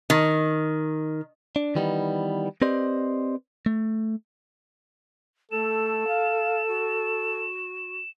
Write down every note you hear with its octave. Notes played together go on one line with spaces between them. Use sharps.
D#3
D4
D#3 E3 G3 B3 D4 D#4
C4 G4 B4 C5 D5 D#5
A3
A3 A4 E7
F5
F#4